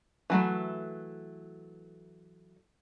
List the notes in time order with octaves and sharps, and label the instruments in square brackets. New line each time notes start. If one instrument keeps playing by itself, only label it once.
[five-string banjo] E3 F#3 A3